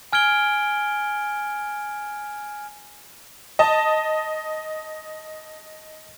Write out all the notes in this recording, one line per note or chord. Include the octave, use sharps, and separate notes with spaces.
G#5 F6 G#6 D7 G7
D#5 A5